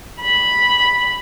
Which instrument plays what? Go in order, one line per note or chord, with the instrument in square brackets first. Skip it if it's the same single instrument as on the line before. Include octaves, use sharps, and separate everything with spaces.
[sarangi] B5